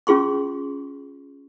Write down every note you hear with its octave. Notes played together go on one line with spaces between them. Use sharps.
C#4 F4 G#4 C6 C#6